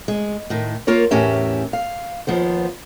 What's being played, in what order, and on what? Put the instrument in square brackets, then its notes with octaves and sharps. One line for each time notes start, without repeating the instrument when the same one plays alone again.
[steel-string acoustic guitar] G#3
A2 D#3
A#3 F4 A#4 C#5
E2 A2 C#4 G4 A#4 E5
F5
D#2 F3 B3 C5